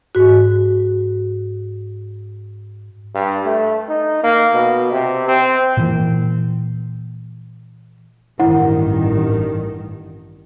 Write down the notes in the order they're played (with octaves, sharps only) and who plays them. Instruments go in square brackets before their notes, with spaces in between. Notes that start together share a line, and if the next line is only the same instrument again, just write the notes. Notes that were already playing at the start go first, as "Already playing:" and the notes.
[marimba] G#2 F#4
[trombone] G2
A3
D#4
A#3
B2
C3
C4
[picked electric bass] A#2 E3 A#3
[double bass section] A1 G2 D#3 [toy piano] E4 F#5